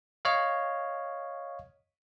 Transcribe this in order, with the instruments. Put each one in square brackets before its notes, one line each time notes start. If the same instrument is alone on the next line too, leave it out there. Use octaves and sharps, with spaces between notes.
[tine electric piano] C#5 D#5 F5